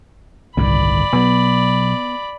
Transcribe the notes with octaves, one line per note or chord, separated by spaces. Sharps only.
G1 C2 A2 D#3 D5 B5
B2 F#3 B3